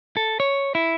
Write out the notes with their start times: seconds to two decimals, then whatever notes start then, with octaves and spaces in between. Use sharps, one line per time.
0.17 A4
0.40 C#5
0.75 E4